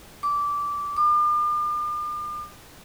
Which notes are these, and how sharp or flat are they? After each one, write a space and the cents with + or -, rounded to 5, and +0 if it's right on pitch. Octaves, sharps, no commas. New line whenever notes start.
D6 -15
D6 +40